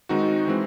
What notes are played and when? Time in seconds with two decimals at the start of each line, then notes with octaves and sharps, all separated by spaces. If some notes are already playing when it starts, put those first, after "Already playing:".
0.09 D#3 G#3 C4 D#4 F#4
0.47 E3 G#3 C4